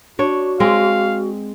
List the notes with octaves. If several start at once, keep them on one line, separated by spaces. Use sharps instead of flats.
D4 F#4 C#5
G#3 C4 F5